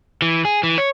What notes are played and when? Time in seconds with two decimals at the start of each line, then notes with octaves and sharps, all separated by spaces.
0.22 E3
0.45 G#4
0.63 E3
0.78 C#5